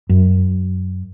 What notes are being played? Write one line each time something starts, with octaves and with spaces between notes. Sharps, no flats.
F#2